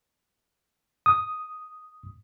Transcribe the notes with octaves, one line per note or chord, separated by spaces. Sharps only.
D#6